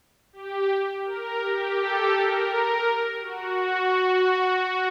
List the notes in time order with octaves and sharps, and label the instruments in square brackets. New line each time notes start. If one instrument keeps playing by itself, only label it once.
[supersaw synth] G4
A#4
G4
A4
A#4
A#4
F#4